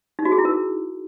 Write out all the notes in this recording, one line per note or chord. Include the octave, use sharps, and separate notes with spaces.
D#4
F#4
G#4
E4
A#4